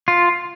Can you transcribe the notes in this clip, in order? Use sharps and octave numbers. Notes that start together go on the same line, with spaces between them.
F4